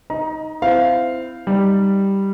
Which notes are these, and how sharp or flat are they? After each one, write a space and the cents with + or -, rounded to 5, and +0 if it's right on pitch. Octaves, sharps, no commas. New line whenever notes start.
D#4 +0 D#5 +15 A#5 +30
C4 -20 E4 +10 F5 +0
G3 +0 D#4 +0